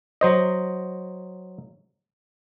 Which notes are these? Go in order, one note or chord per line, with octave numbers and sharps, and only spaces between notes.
F#3 C5 D#5